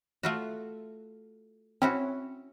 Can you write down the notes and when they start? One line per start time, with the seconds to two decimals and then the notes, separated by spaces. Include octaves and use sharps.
0.23 A3 F4 F#4
1.82 C4 C#4 E4 F#4